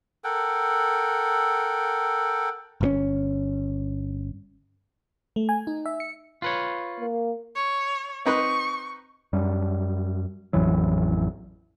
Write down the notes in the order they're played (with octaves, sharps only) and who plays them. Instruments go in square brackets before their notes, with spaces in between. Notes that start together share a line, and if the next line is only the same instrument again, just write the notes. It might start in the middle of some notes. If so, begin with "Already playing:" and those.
[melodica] A4 A#4 F#5 G5
[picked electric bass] G1 B2 C#4
[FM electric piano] A3
G#5
D#4
E5
C#7
[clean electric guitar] F4 B4 C#5
[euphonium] A#3
[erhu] C#5
[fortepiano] C4 D#4 B4 [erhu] C#6
[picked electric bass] F#2 G3
A1 F2 E3 F#3